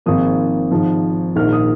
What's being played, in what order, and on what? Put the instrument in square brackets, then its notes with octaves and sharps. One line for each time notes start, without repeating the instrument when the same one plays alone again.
[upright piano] G#1 G#2 F3 A#3 D#6
G#1 G#2 F3
A#1 G#2 D#3 A#3 F6
D#6